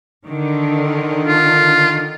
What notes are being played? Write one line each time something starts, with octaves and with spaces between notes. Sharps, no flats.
D3 D#3
F4